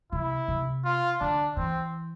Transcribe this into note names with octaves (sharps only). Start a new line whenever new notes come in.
C3 E4
C3
F4
D3 D4
E3 C4